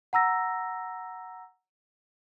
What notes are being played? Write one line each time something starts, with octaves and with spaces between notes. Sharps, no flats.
F#5 A#5 E6 A#6